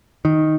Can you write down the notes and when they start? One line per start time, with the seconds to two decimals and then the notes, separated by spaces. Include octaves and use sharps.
0.25 D#3